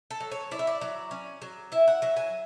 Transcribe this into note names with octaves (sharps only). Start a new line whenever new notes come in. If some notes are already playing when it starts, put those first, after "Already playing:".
A4
F#3
C#5
E4 D5
E5
D5
F#3
C#4
F#3
E4 E5
F#5
F#3 E5
G#5